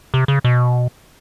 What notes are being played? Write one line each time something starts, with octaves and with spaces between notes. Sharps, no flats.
C3
C#3
B2